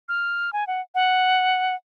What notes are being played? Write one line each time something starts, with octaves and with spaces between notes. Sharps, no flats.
F6
G#5
F#5
F#5